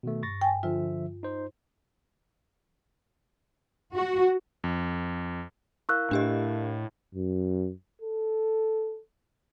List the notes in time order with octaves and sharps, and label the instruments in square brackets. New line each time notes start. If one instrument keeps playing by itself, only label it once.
[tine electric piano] B2 D#3 A3
[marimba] G2 [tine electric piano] C#6 A6 A#6
[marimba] G5 G#5
[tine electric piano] D3 F3 E5 [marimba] F4
[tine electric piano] D#4 C5
[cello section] F#4
[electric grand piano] F2
[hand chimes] E4 A#4 F5 [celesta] C#6 E6 F#6
[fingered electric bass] A2 [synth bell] D4 G4 D#5
[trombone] F#2
A4